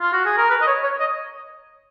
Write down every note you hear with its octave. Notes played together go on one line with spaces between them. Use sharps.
F4
F#4
G#4
A#4
B4
D#5
C#5
C#5
D#5